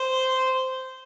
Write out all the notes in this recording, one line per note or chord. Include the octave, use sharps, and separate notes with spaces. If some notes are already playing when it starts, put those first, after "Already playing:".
Already playing: C5